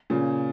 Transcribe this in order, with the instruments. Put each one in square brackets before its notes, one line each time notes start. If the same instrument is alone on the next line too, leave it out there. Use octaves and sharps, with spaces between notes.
[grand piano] A#2 C#3